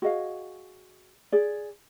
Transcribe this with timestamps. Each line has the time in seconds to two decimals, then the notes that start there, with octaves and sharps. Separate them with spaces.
0.02 F#4 G#4 D#5 F5
1.32 G#4 D5